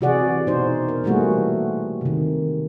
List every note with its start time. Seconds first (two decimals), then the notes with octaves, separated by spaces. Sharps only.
0.01 C3 E3 F#4 G#4 D5 F#5
0.47 B2 D#4 C5
0.89 A#4
1.04 E3 G3 A3 A#3 F#4 G#4
2.01 C3 D#3